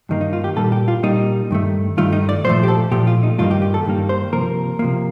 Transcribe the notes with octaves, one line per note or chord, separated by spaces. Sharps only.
G2 D#3 A#3
D#4
F4
G4
A#2 G3 A#3 A4
G4
F4
A#2 G3 A#3 D#4
G2 D#3 A3
G2 D#3 A3 F4
D#4
D5
A#2 F3 A3 C5
G4
A4
A#2 F3 A3 G4
F4
D#4
G2 D#3 G3 A#3 F4
G4
G4
A4
G2 D#3 G3 A#3
C5
C3 F3 A#3 A#4
C3 F3 A#3